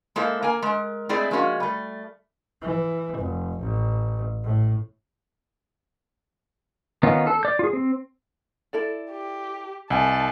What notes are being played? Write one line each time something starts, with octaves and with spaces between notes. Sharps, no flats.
G#3 A#3 E4 A4 C5
A#3 G#5
G#3 A#4
G#3 A3 C4 E4 G#4 D5
F3 G#3 A#3 C#4 F#4
G3 A3
E3
F1
A1
A2
D#3 B3 C#4 D#4 F4
A4
D5 G6
F4 G#4
C4
E4 A4 D5
G4
C2 D#5 G#5 A5